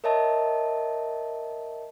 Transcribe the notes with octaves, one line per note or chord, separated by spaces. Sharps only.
A#4 C#5 D#5 E5 A5